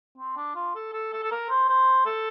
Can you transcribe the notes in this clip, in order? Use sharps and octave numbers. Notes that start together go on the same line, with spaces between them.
C4
D4
F4
A4
A4
A4
A4
A#4
C5
C5
A4